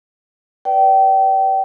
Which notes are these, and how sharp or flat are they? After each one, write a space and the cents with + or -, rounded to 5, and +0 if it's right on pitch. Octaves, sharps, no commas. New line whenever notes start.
B4 +0 D5 +0 G5 -30